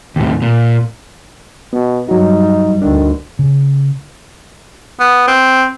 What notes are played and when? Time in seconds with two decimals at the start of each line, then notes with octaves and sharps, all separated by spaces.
0.16 D#2 A2
0.42 A#2
1.73 B2 B3
2.08 G2 F#3 G3 D#4 F#4
2.82 D2 D3 D#3 D4
3.39 C#3
5.00 B3
5.27 C4